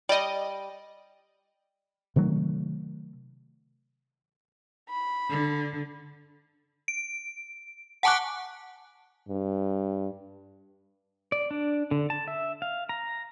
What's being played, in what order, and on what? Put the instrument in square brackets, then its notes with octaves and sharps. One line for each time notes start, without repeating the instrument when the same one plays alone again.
[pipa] G3 [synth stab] D5 D#5
[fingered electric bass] C3 D#3 F#3 A3
[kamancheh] B5
[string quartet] D3
[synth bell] D7
F#5 G#5 A5 C#6 D6 F#6
[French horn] G2
[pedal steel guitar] D5
D4
D3
A5
E5
F5
A#5